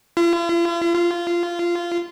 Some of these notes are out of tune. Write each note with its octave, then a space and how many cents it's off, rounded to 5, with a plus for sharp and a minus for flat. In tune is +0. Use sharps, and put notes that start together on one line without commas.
F4 -45
F4 -15